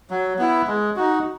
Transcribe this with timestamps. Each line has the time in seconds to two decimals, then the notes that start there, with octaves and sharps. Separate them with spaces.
0.10 F#3
0.39 B3 E4
0.67 G#3
0.96 D#4 F#4